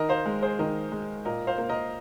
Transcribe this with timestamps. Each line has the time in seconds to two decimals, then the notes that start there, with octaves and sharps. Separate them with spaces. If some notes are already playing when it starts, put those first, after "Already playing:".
Already playing: D#3 A#4 D#5
0.09 C5 F5
0.26 G#3
0.42 G#4 C5
0.59 D#3 A#4 D#5
0.92 G#3
1.25 A#2 A#4 D#5
1.47 C5 F5
1.58 A#3
1.69 A#4 D#5